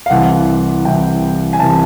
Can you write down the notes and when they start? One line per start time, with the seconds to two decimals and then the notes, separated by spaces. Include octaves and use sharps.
0.06 F5
0.10 C2 C3 E3 F#5
0.85 C2 C3 E3 G5
1.53 G#5
1.59 C2 C3 E3 A5